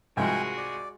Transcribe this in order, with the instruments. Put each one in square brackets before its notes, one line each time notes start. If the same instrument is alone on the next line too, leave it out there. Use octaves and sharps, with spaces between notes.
[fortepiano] C2 G#2 F3 [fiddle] G#3 F#4 [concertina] G5 G#5
[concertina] D5